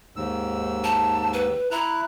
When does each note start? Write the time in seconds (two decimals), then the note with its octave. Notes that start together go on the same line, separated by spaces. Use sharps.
0.16 D#2 G#2 E6
0.84 A5
1.33 B4
1.71 E4 A#5 F#6